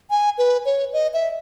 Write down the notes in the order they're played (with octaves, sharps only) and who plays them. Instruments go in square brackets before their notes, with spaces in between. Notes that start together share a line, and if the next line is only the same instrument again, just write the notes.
[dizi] G#5
B4
C#5
D#5
E5